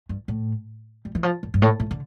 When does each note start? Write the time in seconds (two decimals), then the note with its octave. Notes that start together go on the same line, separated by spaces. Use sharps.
0.09 G2
0.28 A2
1.05 G3
1.15 E3
1.23 F3
1.43 G2
1.54 G2
1.62 A2
1.80 A2
1.91 D3